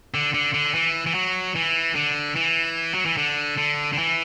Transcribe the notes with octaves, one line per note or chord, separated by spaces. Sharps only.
D3
D3
D3
E3
E3
F#3
E3
D3
E3
F#3
E3
D3
D3
D3
E3